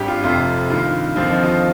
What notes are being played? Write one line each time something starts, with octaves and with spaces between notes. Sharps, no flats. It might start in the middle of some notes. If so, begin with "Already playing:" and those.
Already playing: G#1 G2 G4
F4
F1 F2 C3 F4
G2 D#3 A#3 F4
D#2 D3 F3 C4 F4
D#4
F4